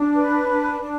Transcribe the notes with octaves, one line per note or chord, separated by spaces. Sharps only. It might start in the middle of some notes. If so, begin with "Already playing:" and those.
Already playing: D4
B4
D4
D4